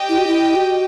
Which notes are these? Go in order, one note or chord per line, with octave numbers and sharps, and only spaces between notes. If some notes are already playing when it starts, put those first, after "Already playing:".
Already playing: G4 D#5 G5
E4
F#4
E4
F#4